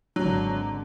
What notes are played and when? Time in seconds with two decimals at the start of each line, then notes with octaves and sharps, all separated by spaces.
0.16 G#1 D3 F#3